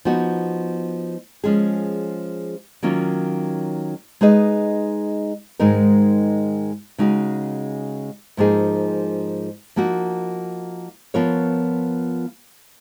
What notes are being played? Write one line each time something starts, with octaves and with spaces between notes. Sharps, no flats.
F3 B3 D#4 F#4
F3 G#3 C#4 G#4
D#3 F#3 A#3 C#4 F4
G#3 D#4 G#4 B4 D#5
G#2 D#3 G#3 D#4 A#4
C#3 G#3 D#4 F#4
G#2 F3 A#3 D#4 G#4
F3 A#3 D#4 F#4
F3 B3 F4 A#4 C#5